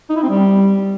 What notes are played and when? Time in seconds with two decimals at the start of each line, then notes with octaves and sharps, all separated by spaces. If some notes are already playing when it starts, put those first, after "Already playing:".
0.10 D#4
0.16 E4
0.23 C4
0.29 G3